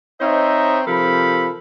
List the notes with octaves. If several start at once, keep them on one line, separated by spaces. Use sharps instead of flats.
C4 D#4 C5 C#5 D#5 E5
C3 F3 A4 A#4 B5